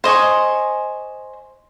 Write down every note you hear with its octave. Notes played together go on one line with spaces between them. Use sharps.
C5 D#5 G#5 C#6